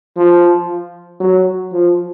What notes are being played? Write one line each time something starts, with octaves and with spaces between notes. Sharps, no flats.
F3
F#3
F3